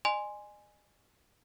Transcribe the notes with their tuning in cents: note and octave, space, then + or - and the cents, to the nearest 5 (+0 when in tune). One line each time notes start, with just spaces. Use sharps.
D#5 -45 G#5 +0 C6 +0